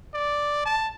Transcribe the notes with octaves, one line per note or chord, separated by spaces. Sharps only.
D5
A5